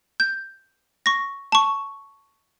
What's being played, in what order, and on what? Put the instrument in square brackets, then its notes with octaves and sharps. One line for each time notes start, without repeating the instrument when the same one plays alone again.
[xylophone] G6
C#6 A#6
A5 C#6